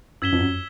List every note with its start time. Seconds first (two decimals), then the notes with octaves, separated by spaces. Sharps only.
0.22 F#2 E6 G#6 B6 E7 G7
0.33 F2
0.38 F#2